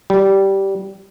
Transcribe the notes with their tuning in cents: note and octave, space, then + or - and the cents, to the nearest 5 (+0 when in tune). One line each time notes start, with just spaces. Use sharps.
G3 -15